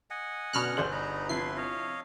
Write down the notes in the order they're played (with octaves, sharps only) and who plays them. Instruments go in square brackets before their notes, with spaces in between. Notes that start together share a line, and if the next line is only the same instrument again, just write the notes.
[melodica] D#5 F#5 G#5
[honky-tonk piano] F#2 D3 [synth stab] B2 F6 F#6
[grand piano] G1 G6 F#7 [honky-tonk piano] D4 G#4 C5
[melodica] D#4 B4 A#5
[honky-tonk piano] C3 F3 E4 [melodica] B4 C6 [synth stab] C7
[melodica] C#5 D#5 F5